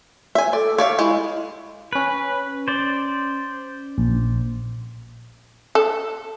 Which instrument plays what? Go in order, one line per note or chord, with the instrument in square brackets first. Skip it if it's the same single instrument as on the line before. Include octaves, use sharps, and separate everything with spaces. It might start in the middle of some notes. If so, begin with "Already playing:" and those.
[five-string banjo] E5 G#5
[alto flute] A4 [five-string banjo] D5
[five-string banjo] C#5 D5 E5 [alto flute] F5
[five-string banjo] G#3 [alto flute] E4
[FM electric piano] C#4 B6 [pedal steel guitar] B4
[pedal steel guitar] C5 D5
[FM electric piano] A#1
[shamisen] A4